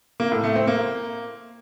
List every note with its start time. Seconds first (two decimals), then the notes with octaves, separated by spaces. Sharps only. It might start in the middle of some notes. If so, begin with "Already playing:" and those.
0.20 A#3
0.32 A2
0.44 A3
0.56 C4
0.67 A#3